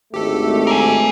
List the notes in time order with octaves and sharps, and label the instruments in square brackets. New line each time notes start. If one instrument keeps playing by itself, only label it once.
[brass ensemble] G#1 D2 A3 [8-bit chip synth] G4 A4
[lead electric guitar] A#4 G#5